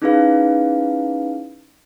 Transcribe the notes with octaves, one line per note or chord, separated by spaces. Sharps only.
C#4 D#4 E4 G#4 B4 F5